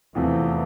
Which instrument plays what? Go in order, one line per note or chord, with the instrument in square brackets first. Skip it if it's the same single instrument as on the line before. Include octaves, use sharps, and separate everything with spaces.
[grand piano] E2 C3 F3 A3 [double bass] E3